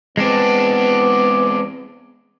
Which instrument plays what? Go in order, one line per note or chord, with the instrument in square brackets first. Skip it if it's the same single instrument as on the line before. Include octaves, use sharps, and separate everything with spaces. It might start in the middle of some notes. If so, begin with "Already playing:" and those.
[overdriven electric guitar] E2 D4 [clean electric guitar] G#3 C4 [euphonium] B3